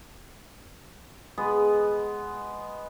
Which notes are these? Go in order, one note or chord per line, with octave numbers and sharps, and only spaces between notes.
G#3 B3